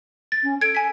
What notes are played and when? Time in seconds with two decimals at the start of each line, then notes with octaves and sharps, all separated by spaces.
0.32 A6
0.43 C#4
0.61 A4 G#6 D7
0.75 G#5 B6